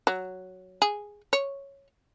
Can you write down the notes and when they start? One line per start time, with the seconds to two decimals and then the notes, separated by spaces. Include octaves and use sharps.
0.07 F#3
0.82 G#4
1.33 C#5